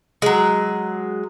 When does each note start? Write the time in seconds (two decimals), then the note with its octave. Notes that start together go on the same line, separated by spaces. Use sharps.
0.22 F#3 G#3